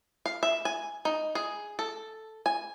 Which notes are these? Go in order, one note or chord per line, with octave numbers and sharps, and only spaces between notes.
F5
E5
G#5
D#4
G#4
A4
G#5